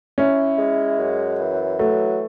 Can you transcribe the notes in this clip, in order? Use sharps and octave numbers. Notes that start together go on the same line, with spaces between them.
C#4 E4
G#3
F#2
E3
F#3 A3